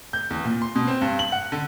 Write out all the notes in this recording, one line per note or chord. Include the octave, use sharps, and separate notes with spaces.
G6
E2
A#2
C6
B2
C4
G2
F#7
F#5
D3